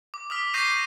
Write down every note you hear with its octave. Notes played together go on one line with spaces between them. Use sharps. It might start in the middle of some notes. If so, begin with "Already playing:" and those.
D6
D6 D#6 F6 B6
C#6 D6 G6 A#6 C7 D#7